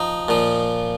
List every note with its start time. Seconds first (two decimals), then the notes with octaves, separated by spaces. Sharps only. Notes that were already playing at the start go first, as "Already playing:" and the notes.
Already playing: F3 D#4
0.28 A#2 F3